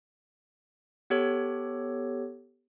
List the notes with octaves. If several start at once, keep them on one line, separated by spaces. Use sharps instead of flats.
B3 G4 A4 C#5